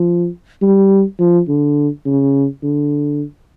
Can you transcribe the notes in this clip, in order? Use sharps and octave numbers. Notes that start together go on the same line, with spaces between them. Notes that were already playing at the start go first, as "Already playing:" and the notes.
Already playing: F3
G3
F3
D3
C#3
D3